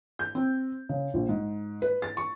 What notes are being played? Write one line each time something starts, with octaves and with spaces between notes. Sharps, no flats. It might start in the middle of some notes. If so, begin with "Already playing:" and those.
G6
C4
C#3
A#1
G#2
B4
A6
C#6